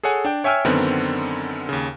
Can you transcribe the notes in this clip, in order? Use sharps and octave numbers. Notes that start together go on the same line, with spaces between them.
G#4 A4 C#5 F#5 G#5
D4 G5
C#5 E5 G5 G#5 E6 F6
F#2 D3 D#3 B3 C4
D#2 C#3